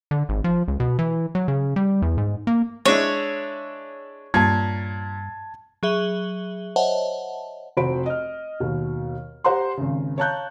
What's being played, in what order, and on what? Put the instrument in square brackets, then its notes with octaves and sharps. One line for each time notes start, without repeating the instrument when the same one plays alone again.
[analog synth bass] D3
G#1
F3
C#2
B2
E3
F#3
C#3
G3
E2
G#2
A#3
[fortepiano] G#3 D4 E4 [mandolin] C#5
[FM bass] G2 [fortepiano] A#2 [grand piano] A5 G#6
[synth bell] F#3 G#4 E5 F#7 G7
C5 C#5 D#5 E5 F#5 A5
[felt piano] F1 F#4 C5 B5 D7
D#5 F6
D#2 B2
G4 C5 F#5 A#5 C6
G#1 C#3
C#5 F5 A5 A#5 F#6 G6